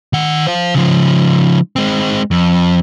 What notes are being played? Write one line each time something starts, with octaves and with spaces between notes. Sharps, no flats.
D#3 F#5
C5 F5
C#3 F3
G#3 C4
F2